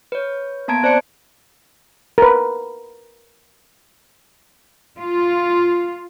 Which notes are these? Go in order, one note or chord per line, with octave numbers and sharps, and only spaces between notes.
B4 C#5
A#3 B3 A5 A#5 G#6 D7
C4 C5 D5 A5 C#7 D7
A#4 B4
F4